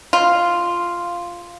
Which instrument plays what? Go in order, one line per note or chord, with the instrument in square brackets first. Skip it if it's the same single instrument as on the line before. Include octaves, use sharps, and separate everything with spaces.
[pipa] F4